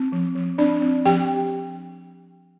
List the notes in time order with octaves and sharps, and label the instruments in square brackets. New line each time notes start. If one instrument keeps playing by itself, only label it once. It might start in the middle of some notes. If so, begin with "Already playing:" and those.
Already playing: [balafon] C4
F3
F3
C4 D4 D5
C4
F3 G4 G5